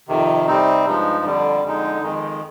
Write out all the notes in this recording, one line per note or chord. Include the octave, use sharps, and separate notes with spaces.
F2 C3 D#3
C3 G3 C4 D#4
G2 F3 G#3 D#4
F2 D3 G3
F2 D3 G#3 D#4
F2 D#3 G#3